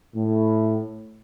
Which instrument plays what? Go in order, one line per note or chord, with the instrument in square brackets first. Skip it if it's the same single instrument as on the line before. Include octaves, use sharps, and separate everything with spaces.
[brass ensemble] A2